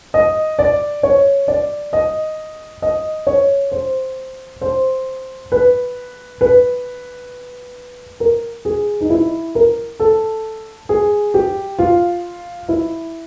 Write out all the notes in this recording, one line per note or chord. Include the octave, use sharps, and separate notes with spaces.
D#5
D5
C#5
D5
D#5
D#5
C#5
C5
C5
B4
B4
A#4
G#4
D#4
E4
A#4
A4
G#4
G4
F4
E4